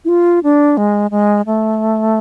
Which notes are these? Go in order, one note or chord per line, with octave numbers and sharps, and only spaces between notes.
E4
F4
D4
G#3
G#3
A3